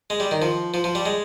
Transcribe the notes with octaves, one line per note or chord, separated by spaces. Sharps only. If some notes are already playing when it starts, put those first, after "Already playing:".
G#3
G3
D#3
F3
F3
F3
G3
G#3